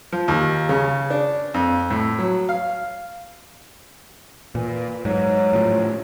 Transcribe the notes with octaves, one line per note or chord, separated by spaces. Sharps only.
F3
D#2
C#3
D4
F2
A2
F#3
F5
A#2 E3
B4
G#2 F#3
A2 F3